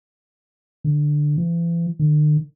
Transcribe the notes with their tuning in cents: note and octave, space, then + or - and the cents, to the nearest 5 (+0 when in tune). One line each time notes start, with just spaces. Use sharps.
D3 +10
E3 +40
D3 +45